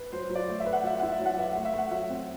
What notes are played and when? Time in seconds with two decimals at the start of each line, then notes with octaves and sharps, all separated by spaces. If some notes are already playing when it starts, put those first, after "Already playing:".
Already playing: B4
0.12 F#3 C5
0.30 F#3
0.35 D5
0.48 A3
0.60 E5
0.66 B4
0.73 F#5
0.83 F#3 E5
0.99 E4 F#5
1.12 E5
1.19 F#3
1.25 F#5
1.38 B4 E5
1.52 A3 F#5
1.65 E5
1.74 A3 F#5
1.91 F#3 E5
2.09 C4